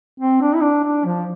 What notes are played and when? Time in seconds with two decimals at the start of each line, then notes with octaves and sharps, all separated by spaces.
0.20 C4
0.41 D4
0.55 E4
0.63 D4
0.84 D4
1.05 F3